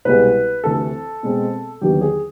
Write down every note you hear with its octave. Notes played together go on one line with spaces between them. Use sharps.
C2 B2 G#3 B4
D2 C3 E3 A4
B2 G#3 C4
D#2 D3 F#3 B3 D#4 G4
G#4